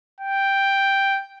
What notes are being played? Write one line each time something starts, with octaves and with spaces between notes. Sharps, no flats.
G5